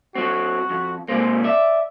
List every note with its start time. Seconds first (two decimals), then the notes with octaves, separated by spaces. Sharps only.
0.15 F#3 C4 F#4
0.70 F2
1.08 G#2 C3 A#3 C5
1.44 D5 E5